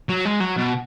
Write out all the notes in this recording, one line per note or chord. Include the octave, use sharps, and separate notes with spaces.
F#3
G#3
F#3
B2